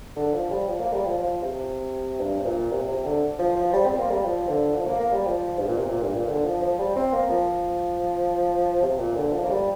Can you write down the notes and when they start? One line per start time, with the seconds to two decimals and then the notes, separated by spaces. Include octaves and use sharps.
0.16 D3
0.34 F3
0.50 G3
0.67 F3
0.80 A#3
0.93 G3
1.05 F3
1.19 F3
1.43 C3
2.21 G2
2.39 C3
2.45 A#2
2.72 C3
2.88 C3
3.05 D3
3.39 F3
3.56 F3
3.73 G3
3.86 C4
3.99 A#3
4.11 G3
4.24 F3
4.49 D3
4.75 F3
4.87 A#3
5.00 A#3
5.13 G3
5.26 F3
5.60 G2
5.68 A#2
5.77 C3
5.89 A#2
6.02 G2
6.15 A#2
6.28 D3
6.45 F3
6.62 F3
6.79 G3
6.96 C4
7.12 A#3
7.30 F3
8.82 C3
8.99 A#2
9.16 D3
9.33 F3
9.45 A#3
9.50 G3